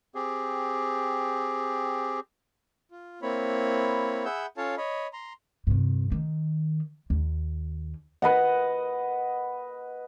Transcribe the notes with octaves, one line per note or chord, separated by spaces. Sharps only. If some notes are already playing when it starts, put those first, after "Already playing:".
C4 G4 G#4
F4
A#3 C4 E4 C#5 B5
G#4 E5 F#5 B5 E6 G6
C#4 F4 A4 C#5 F5 A5
C#5 D#5 B5
A#5 C6
G2 C3
D#3
D#2
B4 D#5 F#5